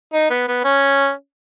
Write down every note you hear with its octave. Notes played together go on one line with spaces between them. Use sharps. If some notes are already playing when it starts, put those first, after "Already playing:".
D#4
B3
B3
C#4